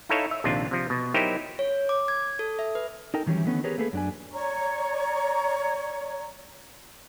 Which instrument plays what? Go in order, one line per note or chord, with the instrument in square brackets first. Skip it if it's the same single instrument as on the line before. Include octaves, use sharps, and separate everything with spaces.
[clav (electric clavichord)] D#4 E4 A4 C#5 E5 F5
E5
A#1 D#2 C3 D4 F4
C3 F3
B2
F#3 D#4 E4 G4 A#4 C5
[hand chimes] C#5
D6
G#6
A4
E5
B4
[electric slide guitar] D#4 A4 A#4 G5
D#3 E3 F#3 G3 C#4 E4
D3 D#3 A3 B3 C#4
G4 G#4 A#4 B4 C#5
A3 A#3 G#4 A4 B4
F#2 D4 G#5
[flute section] C#5 D5 A#5 C#6